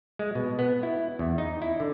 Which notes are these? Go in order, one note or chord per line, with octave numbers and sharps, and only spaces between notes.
G#3
B2
B3
E4
E2
D#4
E4
D3